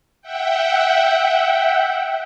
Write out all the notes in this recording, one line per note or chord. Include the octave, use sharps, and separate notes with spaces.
E5 F#5 G5